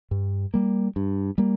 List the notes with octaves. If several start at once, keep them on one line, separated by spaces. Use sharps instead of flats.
G2
G3 A#3
G2
G3 A#3